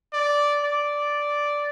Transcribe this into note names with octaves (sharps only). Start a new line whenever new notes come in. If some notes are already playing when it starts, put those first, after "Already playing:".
D5
D5